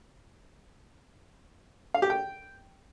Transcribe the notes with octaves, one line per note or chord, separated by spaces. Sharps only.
F5
G4
G5